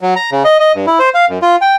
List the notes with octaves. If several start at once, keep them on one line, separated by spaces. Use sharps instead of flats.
F#3
A#5
C#3
D#5
D#5
G2
E4
C5
F5
F#2
F4
G5